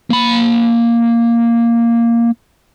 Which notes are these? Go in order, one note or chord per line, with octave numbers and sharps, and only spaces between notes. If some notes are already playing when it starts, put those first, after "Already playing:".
A#3 B5